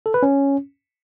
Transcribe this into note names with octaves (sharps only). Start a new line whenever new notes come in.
A4
B4
C#4